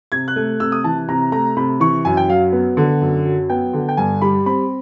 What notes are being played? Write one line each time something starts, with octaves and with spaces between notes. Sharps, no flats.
C3 G#6
F#6
A3
C3 E6
D#6
E3 A5
C3 A#5
A3 A#5
C3 B5
E3 C#6
F#2 G#5
G5
F#3 F5
B3
D3
F#2
F#3
B3 G5
D3
G5
G2 G#5
G3 B5
C4 B5